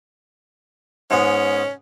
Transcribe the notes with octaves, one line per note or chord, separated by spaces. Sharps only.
G#2 G#3 B3 C#4